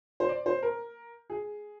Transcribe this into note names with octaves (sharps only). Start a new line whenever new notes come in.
C5
D5
C5
A#4
G#4